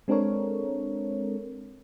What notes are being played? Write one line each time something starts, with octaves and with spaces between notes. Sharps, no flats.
G#3 C4 D4 A4 A#4 C#5